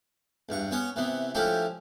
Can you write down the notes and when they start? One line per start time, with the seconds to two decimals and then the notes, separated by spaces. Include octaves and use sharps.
0.49 E2 G2 C#6
0.71 B3 C#4 C#5 F#5
0.96 C3 E3 B3
1.35 F3 A3 C#4 D4 E4 G4